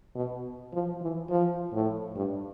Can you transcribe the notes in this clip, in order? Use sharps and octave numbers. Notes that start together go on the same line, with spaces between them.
B2
F3
E3
F3
A2
G2